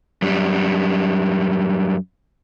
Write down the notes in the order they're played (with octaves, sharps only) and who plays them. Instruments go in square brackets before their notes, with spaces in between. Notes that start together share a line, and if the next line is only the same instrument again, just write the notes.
[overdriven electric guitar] F#2 G3